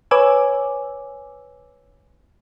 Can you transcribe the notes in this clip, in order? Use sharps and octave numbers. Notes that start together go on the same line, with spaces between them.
B4 C#5 G#5 D6 E6